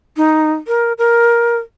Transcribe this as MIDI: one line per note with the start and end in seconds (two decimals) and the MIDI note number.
0.17 0.52 63
0.67 0.93 70
0.98 1.57 70